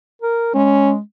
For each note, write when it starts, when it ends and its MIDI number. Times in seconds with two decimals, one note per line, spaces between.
0.22 0.50 70
0.55 1.00 56
0.55 0.93 61